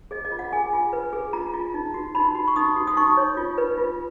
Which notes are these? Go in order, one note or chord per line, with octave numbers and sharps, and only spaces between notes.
G#4 D#5
D#5
F4
F#5
G#4 G#5
F4
B4
G#4
F4 A#5
F4
D#4
F#4
D#4 B5
F#4
C#6
D#4 D#6
F#4
D#6
D#4 C#6
C#5
F4
B4
F4